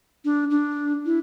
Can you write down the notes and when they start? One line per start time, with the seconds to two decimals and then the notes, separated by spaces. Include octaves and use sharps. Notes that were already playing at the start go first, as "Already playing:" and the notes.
0.25 D4
0.51 D4
1.06 E4